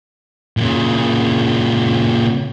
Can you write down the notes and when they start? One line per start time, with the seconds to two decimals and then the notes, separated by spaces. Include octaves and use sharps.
0.57 A#2 C#3